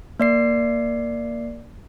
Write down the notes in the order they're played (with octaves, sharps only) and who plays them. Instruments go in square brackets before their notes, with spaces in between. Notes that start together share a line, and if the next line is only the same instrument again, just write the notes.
[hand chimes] A#3 D5 C7